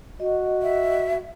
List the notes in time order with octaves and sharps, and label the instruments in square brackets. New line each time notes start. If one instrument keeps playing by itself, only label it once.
[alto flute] F#4 [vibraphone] D#5
[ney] E5